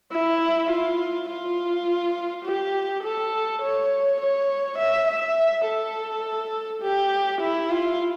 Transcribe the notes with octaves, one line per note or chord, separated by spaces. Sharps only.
E4
F4
F4
G4
A4
C#5
C#5
E5
E5
A4
G4
E4
F4